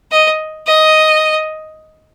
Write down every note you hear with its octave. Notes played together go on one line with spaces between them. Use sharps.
D#5
D#5